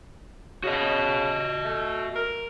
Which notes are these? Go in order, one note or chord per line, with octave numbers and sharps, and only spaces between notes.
C#3 F#4 D#5
A3
A#4